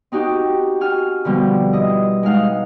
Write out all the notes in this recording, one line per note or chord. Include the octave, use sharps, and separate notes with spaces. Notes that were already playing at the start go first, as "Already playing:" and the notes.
C4 D#4 F#4 G4
F#4 G#5 F6
B2 D3 F3 G3 C4
E4 D#5
G#3 D#4 F5 F#5